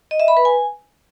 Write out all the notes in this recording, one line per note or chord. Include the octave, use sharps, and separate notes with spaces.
D#5
E5
B5
B4
G#5